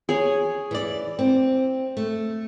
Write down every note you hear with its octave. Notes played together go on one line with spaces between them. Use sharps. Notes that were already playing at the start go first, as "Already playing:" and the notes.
G#4 C#5
E3 D5
C4
A3